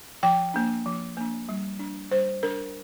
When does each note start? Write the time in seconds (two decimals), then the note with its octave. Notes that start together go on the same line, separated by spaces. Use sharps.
0.23 F3 G5
0.54 A#3 D4
0.86 F3
1.17 A#3 D4
1.49 G3
1.79 D4
2.11 G3 C5
2.43 D4 A#4